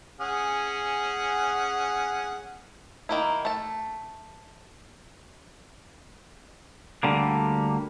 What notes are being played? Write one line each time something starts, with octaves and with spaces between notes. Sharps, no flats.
C#4 G#4 F#5
D#3 A#3 E4
A3 A5
D2 D3 G3 A#3